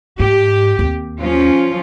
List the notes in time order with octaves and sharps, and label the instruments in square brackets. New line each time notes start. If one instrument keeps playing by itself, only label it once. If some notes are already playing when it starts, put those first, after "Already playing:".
[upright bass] G#2 [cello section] G4
[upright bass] D#2 C4
[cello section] F3 C#4 F4